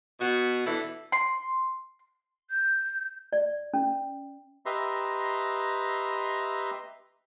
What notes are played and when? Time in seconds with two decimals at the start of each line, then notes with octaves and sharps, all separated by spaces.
0.20 B2 F#4
0.66 B2 E3 D4 E4 A4
1.12 C6
2.50 G6
3.33 D5
3.74 C#4
4.66 G4 B4 D#5 E5 A#5 C6